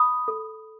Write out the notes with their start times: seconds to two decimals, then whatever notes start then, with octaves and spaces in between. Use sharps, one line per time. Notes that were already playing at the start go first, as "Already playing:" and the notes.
Already playing: B5 D#6
0.28 A4